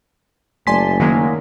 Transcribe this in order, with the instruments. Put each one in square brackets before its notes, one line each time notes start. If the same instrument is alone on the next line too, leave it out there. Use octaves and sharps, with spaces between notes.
[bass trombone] F#1 [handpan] F#3 A3 D5 [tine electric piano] G#5 B6 [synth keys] A5 C6
[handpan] D#3 [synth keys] F#3 G#3 A#3